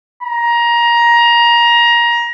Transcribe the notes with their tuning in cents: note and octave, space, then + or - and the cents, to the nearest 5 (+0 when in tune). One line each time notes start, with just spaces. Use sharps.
A#5 +20